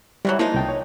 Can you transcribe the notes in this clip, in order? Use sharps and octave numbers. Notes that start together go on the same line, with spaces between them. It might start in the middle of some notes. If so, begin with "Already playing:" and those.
C3 E3 F#3 G3
F3 G#3 A#3 D#4 E4
C2 G5 A5
C#5